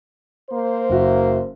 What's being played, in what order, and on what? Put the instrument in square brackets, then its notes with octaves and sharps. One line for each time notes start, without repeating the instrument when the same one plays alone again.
[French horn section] A#3 C5
[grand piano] F#1 F#4 E5